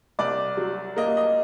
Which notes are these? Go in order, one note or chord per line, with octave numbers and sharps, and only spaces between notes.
C2 D5
F#3
A#3 D#5
D#5